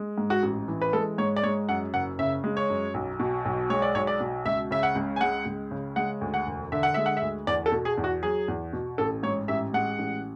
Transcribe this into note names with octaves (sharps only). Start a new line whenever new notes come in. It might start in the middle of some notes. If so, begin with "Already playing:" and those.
Already playing: G#3
G#2
F#4
A1
E3
B4
G#3 A4
G#2 C#5
D5
G#3 C#5
F#2 F#5
F#1 F#5
C#3 E5
G#3
C#5
F#2
B1
B2
B1
G#3 C#5
D5
B1 C#5
D5
B2
C#2 E5
C#3 E5
F#5
C#2
G#5
G#3 F#5
C#2
C#3
G#3 F#5
D2
F#5
E1
D3 E5
F#5
G#3 E5
F#5
E5
D2
E2 D5
A4
B2
G#4
E2
F#4
F#3 G#4
E2
B2
A1 A4
G#2 C#5
A1 E5
G#3 F#5
A1